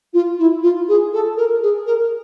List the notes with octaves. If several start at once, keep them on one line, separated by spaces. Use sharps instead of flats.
F4
E4
F4
G#4
A4
A#4
G#4
A#4